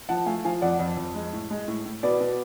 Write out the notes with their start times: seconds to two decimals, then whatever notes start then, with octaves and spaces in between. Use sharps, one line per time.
0.09 F3 F#5 A5
0.26 A3 F5 G#5
0.45 F3 F5 G#5
0.61 F2 D5 F#5
0.80 F2
0.97 F2
1.15 G#3
1.33 A2
1.50 G#3
1.68 A2
1.86 A2
2.03 B2 B4 D5
2.20 B2